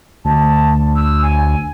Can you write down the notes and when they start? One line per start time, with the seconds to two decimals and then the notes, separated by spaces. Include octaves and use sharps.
0.25 D2 A5
0.96 E6
1.23 G#5